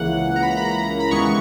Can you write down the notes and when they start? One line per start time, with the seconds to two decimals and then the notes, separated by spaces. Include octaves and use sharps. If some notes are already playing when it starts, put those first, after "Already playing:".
Already playing: C#2 C#3 E3 A#3 F#5
0.36 A#5
0.43 B5
0.50 A#5
0.57 B5
0.65 A#5
0.71 B5
0.78 A#5
1.00 B5
1.11 D#2 C#3 E3 G#3 B3 C#6